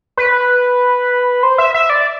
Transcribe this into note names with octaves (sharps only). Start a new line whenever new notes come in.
B4
C5
E5
E5
D5